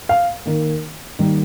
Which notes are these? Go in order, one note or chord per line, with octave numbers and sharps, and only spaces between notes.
F5
D#3 A#3
D#3 G3 A#3